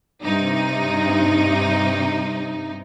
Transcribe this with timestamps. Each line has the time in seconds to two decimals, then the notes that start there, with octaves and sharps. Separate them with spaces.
0.23 G2 C3 D#4